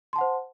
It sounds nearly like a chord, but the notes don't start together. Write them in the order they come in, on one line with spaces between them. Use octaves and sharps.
C6 A5 F#5 C5